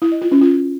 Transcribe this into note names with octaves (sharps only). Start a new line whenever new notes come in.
E4
D#5
F4
C#4
F4